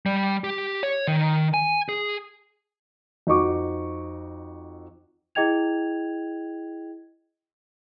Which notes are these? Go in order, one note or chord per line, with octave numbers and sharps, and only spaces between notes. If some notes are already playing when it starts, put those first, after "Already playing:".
G3
G4
C#5
D#3
G#5
G#4
F2 D#4 F#4 C#6 D6
E4 G#4 D#5 G5 G#6 F7